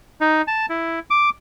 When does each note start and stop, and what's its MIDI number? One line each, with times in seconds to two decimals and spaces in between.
0.21 0.42 63
0.47 0.66 81
0.69 0.99 64
1.10 1.30 86